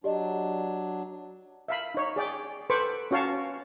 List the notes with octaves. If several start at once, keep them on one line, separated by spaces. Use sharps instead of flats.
F#3 D4 G4 D5 D#5
E5 F5 B5
D#4 C#5
G#4 D5 G5
A4 B4 C5 B5 C#6 D6
C#4 F#4 C#5 F5 A5 C#6